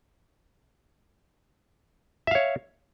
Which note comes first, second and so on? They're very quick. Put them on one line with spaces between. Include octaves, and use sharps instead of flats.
E5 F5 C#5